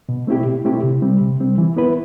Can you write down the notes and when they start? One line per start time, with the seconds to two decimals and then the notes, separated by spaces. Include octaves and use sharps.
0.09 B2
0.27 A3 C4 E4 G4
0.46 B2
0.65 A3 C4 E4 G4
0.83 C3
1.02 G3 C4
1.21 C3
1.40 G3 C4
1.58 E3
1.76 B3 E4 B4